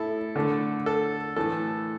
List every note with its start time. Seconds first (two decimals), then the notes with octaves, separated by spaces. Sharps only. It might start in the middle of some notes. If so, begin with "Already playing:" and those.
Already playing: A2 E4 A4
0.36 D3 A3
0.86 A4
1.36 A2 E3 A3 A4